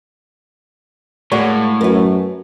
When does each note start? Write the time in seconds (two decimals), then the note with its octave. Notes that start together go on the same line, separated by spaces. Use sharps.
1.32 A2 G#3 A#3 F#4 C#5 D5 F#5
1.81 F#2 A#4 B4